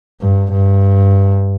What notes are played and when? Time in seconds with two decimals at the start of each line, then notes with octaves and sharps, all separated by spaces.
0.21 G2
0.52 G2